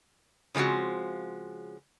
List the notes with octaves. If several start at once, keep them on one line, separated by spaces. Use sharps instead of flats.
C#3 F3 G#3 C4 F#4